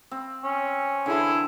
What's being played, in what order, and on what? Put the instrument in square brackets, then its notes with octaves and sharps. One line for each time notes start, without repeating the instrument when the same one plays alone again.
[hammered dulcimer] C4
[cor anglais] C#4
[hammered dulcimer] D3 E3 [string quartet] E4 G#4 A4